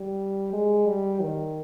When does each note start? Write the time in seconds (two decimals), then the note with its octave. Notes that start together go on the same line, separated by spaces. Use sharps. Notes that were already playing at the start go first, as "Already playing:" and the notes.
Already playing: G3
0.53 G#3
0.88 G3
1.22 D#3